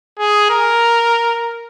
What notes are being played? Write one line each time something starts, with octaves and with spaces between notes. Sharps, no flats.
G#4
A#4